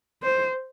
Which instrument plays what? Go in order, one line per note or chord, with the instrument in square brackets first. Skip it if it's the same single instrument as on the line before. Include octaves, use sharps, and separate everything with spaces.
[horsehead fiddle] C5